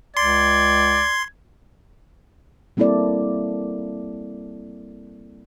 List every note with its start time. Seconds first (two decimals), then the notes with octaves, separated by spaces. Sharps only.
0.17 C#2 D5 C6 G#6
2.77 G3 A#3 C4 E4 A4 D5